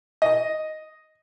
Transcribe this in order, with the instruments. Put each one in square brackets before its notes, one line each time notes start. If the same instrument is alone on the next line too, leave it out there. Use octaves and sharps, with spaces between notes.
[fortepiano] D#5